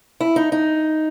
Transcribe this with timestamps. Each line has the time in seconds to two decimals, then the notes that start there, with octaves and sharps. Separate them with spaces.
0.21 E4
0.36 D#4
0.52 D#4